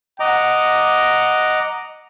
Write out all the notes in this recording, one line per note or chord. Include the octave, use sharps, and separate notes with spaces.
D#5 F#5 A#5 D6